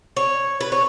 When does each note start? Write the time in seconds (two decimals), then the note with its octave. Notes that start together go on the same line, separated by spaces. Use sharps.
0.16 C#5
0.61 B4
0.72 C#5